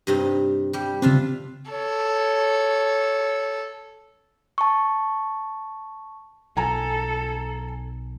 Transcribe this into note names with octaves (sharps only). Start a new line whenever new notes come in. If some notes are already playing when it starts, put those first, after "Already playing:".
G2 C3 D#4
G3 G4
C#3 C4 D4 F4 E5
A4 C#5
A5 C#6
B1 A4 G#5 A#5